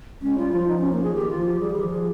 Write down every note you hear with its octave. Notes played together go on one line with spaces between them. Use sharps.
G#3 C#4
G3 F4
F3 F4
D#4
C#4
A#3
G#4
D#3 G4
F4
F3
G4
G3 G#4
D#3 G4
F3 G#4